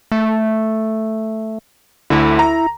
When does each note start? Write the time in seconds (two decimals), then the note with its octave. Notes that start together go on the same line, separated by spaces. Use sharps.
0.12 A3
2.10 D2 D3 E4
2.39 A#5